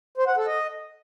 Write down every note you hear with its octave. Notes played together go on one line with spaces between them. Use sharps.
C5
F#5
A4
D#5